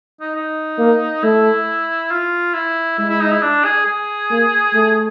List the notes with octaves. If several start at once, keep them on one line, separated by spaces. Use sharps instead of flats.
D#4
D#4
A#3
A3 E4
F4
E4
G#3 E4
E4
D#4
E4
D4
G#4
G#4
A#3
A3